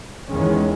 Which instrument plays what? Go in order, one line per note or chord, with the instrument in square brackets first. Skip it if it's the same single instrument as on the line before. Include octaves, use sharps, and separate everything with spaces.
[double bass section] E2 D#3 G#3 C#4